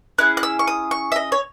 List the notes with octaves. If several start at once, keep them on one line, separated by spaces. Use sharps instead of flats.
C#4 E4 G#4 F#6
F#6
E6
C#6
D#6
C#6
E5
D#5
C#5